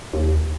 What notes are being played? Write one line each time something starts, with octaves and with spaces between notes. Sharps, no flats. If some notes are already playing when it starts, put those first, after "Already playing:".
D#2